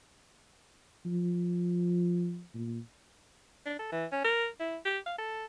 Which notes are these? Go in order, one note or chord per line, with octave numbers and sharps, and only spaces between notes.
F3
A#2
D4
A4
E3
C#4
A#4
E4
G4
F5
A4